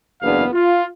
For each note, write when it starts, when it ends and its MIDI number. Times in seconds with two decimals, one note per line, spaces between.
0.22 0.45 30
0.22 0.45 40
0.22 0.45 59
0.22 0.45 62
0.22 0.45 77
0.53 0.85 65